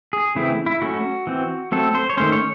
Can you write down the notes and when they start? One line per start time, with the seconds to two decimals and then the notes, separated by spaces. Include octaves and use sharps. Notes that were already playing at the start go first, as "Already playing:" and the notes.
0.13 G#4
0.35 C#3 E3 A3 C4 E4
0.66 E4
0.82 F#3 A3 C#4 F#4
1.27 E3 C4
1.72 F#3 A3 C4 A4
1.95 C5
2.10 C#5
2.17 D#3 A3 C#4 C5
2.32 C#5